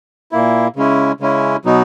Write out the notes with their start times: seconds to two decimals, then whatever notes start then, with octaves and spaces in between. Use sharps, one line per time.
0.32 A#2 A#3 E4
0.76 C#3 G#3 C#4 E4
1.20 C#3 G#3 C#4 E4
1.65 B2 F#3 B3 D#4